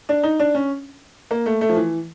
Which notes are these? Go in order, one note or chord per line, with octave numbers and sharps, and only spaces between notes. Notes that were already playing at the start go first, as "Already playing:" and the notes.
D4
D#4
D4
C#4
A#3
A3
A3
F3
E3